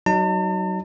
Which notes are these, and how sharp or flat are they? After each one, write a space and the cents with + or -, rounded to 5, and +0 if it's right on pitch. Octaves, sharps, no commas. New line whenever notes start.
F#3 +25 D#4 +0 A5 +45